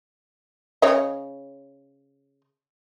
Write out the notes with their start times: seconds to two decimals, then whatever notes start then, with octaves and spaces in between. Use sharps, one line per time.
0.82 C#3 C#5 D#5